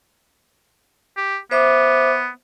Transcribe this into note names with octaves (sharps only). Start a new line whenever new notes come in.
G4
B3 C5 E5 D6